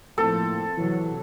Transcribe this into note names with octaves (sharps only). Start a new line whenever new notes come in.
A2 F3 A#3 C4 A4
C3 E3 F#3